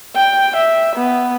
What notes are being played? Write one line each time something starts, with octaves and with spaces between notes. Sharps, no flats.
G5
E5
B3